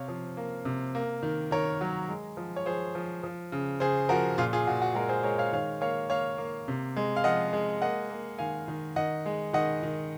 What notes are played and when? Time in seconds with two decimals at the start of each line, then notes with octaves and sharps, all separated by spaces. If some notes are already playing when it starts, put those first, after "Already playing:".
Already playing: C3 C#5 F5
0.08 F3
0.37 A#3
0.65 C3
0.95 A#3
1.23 D#3
1.51 D#3 A#4 C#5
1.81 F#3
2.09 G#3
2.37 F3
2.56 C#5
2.66 F3 G#4 C5
2.95 F3
3.23 F3
3.52 C#3
3.80 C#3 G#4 C5
4.09 F3 F#4 A#4
4.38 A#2 F4 G#4
4.53 F4 G#4
4.67 A#2 F#4
4.82 F#4
4.95 G#3 F#4 A#4
5.09 G#4 C5
5.23 G#3 A#4 C#5
5.38 C#5 F5
5.52 D#3 C#5 F5
5.81 A#3 C#5 F5
6.10 A#3 C#5 F5
6.38 A#3
6.68 C3
6.96 G#3
7.16 F5
7.24 F3 D#5 F#5
7.53 G#3
7.82 A#3 D#5 F#5
8.10 A#3
8.39 D#3 F5 G#5
8.68 D#3
8.96 D#3 D#5 F#5
9.26 G#3
9.53 D#3 D#5 F#5
9.83 D#3